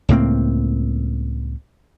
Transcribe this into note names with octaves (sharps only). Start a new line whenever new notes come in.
C#2 A2 A#3 C4